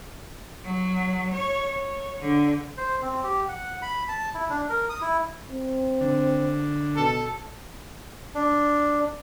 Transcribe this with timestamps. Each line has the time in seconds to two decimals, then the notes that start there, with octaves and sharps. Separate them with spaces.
0.64 F#3
1.34 C#5
1.78 C#5
2.21 D3 D4
2.77 C5
3.02 C4
3.23 G4
3.48 F#5
3.82 B5
4.08 A5
4.34 E4
4.50 D4
4.69 A#4
4.89 D#6
5.01 E4
5.49 C4
6.01 D3
6.96 B2 A4
8.35 D4